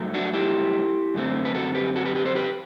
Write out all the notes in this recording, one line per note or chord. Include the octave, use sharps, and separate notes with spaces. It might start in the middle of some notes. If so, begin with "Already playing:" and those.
Already playing: G2 F#3 A3
D4 F#4
E4 G4
F#2 D3 A3 C4
B4
F#4 A4
G4 B4
F#4 A4
G4 B4
G4 B4
A4 C5
G4 B4